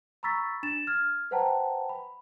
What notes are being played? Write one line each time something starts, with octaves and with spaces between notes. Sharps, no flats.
A#5 B5 C#6 E6 A6 B6
D4 A6 E7
F6 G#6
B4 C5 F#5 G5 A5 A#5
B5